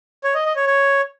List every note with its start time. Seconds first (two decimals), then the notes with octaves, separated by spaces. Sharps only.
0.24 C#5
0.35 D#5
0.45 D#5
0.56 C#5
0.67 C#5